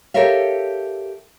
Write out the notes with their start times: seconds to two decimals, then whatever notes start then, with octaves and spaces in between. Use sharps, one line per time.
0.14 G4 A4 A#4 C#5 E5 F5